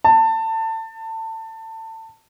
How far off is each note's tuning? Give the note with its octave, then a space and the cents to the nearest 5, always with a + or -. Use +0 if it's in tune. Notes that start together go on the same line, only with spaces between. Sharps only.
A5 +25